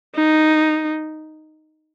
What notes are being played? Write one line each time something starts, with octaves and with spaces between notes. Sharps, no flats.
D#4